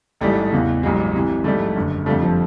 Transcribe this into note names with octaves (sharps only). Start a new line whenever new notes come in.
A1 G#2 E3 G3 A3
E2 C#3 E3
A1 G2 E3 F#3 G#3
C2 C3 E3
A#1 G#2 E3 G3 A3
F#1 F#2 D3
F1 F2 D3 F3 G3 A3
F3